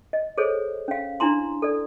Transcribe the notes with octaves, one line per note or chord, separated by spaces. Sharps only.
D#5
G#4 A4 C5 C#5
C#4 F5
D4 E4 A#5 C6
A4 D5